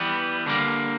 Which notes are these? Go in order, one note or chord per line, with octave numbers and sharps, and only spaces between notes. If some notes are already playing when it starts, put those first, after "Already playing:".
Already playing: E3 G3 B3
D3 G3 A#3